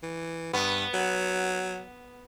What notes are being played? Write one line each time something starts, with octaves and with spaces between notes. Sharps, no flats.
E3
G2 B3
F#3